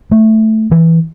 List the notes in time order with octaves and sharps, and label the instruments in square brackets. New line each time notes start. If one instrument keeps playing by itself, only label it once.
[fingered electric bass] A3
E3